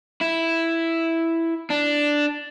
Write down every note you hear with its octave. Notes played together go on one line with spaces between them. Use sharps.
E4
D4